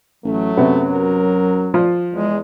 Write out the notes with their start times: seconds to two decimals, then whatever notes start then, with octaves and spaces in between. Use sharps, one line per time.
0.24 A1 F#3 A3
0.57 F#2 C3 B3
0.92 A#4
1.74 F3 F4
2.13 E2 G#3